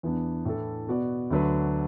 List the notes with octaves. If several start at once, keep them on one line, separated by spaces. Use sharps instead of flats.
E2 E3 B3 D4
A2 E3 D4 A4
B2 B3 F#4 D5
D2 D3 F#3 D4 B4